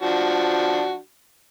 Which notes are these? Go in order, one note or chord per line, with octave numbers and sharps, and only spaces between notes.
F3 D4 F#4